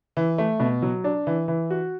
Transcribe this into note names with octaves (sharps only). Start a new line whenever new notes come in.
E3
A3
B2
F#3
D4
E3
E3
F#4